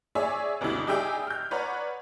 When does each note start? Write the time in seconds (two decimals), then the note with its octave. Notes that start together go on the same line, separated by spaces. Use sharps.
0.15 G#4 C#5 D5 E5 G#5
0.61 G1 C#2 G2 B2 E4
0.87 G3 D#4 G4 G#4 E5 G5
1.27 F6 G6
1.51 B4 C#5 D5 F#5 A#5